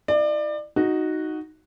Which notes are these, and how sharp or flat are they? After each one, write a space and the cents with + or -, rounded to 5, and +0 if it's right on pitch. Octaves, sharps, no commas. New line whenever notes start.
E4 +0 D5 +30
D#4 +0 F#4 +0